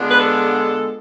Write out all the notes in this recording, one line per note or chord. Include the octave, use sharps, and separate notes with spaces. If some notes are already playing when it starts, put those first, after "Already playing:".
Already playing: D3 G#3 B3 D4 F4
B4
A4